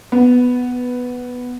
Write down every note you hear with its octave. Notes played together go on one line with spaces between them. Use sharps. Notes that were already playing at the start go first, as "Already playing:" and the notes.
B3